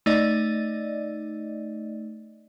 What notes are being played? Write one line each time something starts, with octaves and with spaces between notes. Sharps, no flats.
A3 D#4 D5 D#5